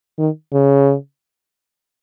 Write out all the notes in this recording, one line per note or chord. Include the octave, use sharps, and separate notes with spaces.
D#3
C#3